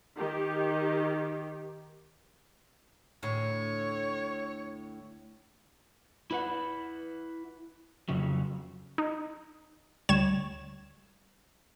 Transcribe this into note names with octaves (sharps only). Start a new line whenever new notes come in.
D#3 G4
D2 A2 C#5
E4 B4 F#5
F2 C#3 F#3
D#4
D2 G3 C#5 G#6 E7